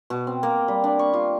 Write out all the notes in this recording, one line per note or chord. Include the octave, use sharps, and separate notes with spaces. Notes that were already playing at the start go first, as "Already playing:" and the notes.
B2
C4
A#3
G3
D4
C#6
F4